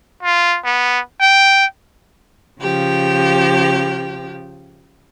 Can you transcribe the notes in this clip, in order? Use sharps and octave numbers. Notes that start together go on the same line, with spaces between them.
F4
B3
G5
C#3 F3 G4